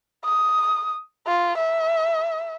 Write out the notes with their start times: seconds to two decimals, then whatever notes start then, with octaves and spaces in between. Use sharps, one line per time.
0.25 D#6
1.27 F4
1.57 E5